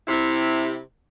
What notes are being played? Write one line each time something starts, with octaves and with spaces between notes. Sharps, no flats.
C3 E4